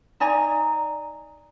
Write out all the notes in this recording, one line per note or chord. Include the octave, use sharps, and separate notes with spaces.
D#4 D5 G#5 A#5